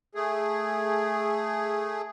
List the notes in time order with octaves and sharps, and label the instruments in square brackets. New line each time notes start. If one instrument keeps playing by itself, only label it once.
[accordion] A3 G#4